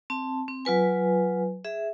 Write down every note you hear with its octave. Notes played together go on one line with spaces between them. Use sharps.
C4 A5
C4
F#3 F4 B4 G#5
G#4 E5